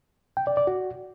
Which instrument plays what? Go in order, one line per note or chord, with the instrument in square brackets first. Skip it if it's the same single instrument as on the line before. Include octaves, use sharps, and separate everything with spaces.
[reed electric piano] G5
D5
D5
F#4